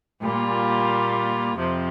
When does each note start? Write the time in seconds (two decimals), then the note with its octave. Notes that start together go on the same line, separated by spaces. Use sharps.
0.22 A#2 G3 A#3 F4
1.57 F2 C3 F3 C4